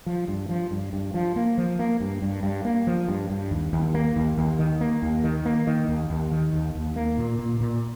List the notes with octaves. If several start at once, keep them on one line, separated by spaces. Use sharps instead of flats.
F3
G2
F3
G2
G2
F3
A#3
F3
A#3
G2
G2
G2
A#3
F3
G2
G2
D#2
D#2
A#3
D#2
D#2
D#3
A#3
D#2
D#3
A#3
D#3
D#2
D#2
D#3
D#2
D#2
A#3
A#2
A#2
A#2